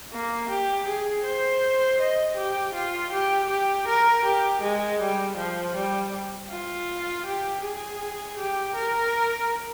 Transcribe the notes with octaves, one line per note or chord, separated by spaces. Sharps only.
A#3
G4
G#4
C5
D#5
G4
F4
G4
G4
A#4
G4
G#3
G3
F3
G3
F4
G4
G#4
G4
A#4